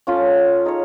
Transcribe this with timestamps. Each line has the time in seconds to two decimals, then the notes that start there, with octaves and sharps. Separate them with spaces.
0.07 C#4 F4 A4
0.65 D#4 G#4 C#5